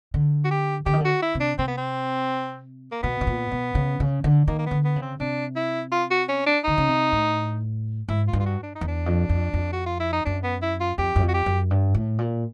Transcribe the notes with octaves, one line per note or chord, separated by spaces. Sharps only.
D3
F#4
G4
D3 G4
D#3
D3
F#4
E4
C3
D4
C3 C4
B3
C4
A#3
B2 B3
B2
A#2
B2
C#3
C#3
D3
D#3 A#3
A#3
B3
D3
B3
C#3
C4
C3 D4
E4
F4
F#4
C#4
D4
D3 D#4
C#3
C3
A2
G#2 E4
F4
G2
F4
F#4
D4
D#4
E2
D4
F2
F2
F2
F#4
F4
E4
D#4
F#2 D4
B3
E4
F4
F2 G4
F#2
F2
F#4
G4
F#2
G2
A2
A#2